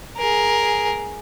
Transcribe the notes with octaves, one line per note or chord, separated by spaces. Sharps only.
G#4 A#4